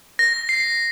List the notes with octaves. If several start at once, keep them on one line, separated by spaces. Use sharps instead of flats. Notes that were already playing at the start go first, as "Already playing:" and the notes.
A#6
C7